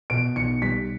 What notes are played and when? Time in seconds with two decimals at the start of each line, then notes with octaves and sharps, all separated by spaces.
0.10 B2 D7
0.36 B1 C#7
0.62 G3 B6